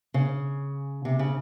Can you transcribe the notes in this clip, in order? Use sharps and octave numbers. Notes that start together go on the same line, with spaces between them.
C#3
C3
C#3